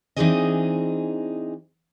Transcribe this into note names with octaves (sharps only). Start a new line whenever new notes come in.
E3 C4 D4 D#4 G#4 D#5